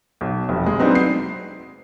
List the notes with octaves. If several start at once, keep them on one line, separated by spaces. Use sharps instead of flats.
B1
F1
G#3
F#3 B3 C4 D4 D#4
C7